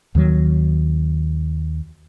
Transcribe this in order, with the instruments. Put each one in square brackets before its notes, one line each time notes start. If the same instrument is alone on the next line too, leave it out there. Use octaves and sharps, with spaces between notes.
[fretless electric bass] D#2 D#3 F#3